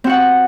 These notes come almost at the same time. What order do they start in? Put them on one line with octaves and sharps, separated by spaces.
C4 F#4 F#5